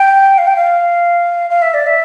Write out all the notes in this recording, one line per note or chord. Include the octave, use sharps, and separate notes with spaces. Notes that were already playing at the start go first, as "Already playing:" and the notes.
Already playing: G5
F5
G5
F5
F5
E5
D5
E5